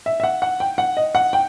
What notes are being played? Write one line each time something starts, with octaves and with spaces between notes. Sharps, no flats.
E5
E5
F#5
F#5
G5
F#5
D#5
F#5
G5